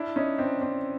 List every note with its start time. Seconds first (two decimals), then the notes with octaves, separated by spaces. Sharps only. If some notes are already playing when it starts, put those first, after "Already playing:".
Already playing: D4 E4
0.16 C#4 D#4
0.38 C4 D4
0.61 C4 D4